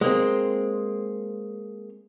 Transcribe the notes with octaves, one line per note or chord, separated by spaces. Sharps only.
G#3 A#3 C4